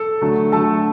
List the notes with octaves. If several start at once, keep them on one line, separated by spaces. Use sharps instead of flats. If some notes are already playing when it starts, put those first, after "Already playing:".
Already playing: A4 A5
D3 F#3 A3
D3 F#3 A3 A4 A5